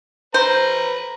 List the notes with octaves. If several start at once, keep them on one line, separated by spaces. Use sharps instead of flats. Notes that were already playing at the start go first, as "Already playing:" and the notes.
B4 C5 A#5